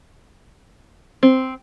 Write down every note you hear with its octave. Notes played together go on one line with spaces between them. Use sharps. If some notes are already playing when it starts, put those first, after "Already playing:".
C4